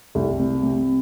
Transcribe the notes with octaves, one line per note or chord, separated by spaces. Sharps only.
C2
C3
C3